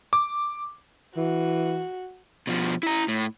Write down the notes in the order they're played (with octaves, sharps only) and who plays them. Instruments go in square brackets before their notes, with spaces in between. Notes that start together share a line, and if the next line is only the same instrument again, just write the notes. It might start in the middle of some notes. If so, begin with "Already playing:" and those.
[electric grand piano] D6
[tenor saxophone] E3 [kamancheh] F#4
[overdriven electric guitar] B2 F3
E4 A#5
A2